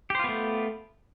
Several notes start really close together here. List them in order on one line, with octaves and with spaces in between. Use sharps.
G4 C5 F4 B3 A3